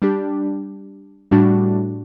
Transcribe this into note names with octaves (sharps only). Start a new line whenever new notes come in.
G3 D4 G4
A2 G3 D4 F#4